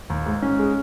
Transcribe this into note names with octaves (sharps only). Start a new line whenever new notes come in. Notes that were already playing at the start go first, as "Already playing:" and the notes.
D#2
G#2
C#4
G#3